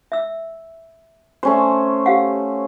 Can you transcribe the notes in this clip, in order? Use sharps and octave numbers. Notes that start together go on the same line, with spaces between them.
E5 E6
A3 C#4 C5 C6
G4 F5 F#5